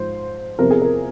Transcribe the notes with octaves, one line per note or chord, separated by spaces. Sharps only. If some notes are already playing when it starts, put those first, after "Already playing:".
Already playing: G#2 F3 C5
E2 C3 F3 A#4
G#4
A#4